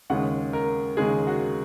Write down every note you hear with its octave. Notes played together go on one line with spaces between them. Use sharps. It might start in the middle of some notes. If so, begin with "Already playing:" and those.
D#2 C#3 G#3 F#5
A#4
D#2 C#3 G#3 G#4
F#4